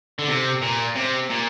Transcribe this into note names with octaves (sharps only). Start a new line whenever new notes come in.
D3
C3
A#2
C3
A#2